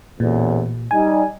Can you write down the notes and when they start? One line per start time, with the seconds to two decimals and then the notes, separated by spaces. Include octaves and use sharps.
0.20 A1 E2 A#2
0.91 G3 D#4 G#5